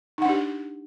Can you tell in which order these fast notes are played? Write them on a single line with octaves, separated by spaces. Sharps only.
D#4 F#5 D4 G4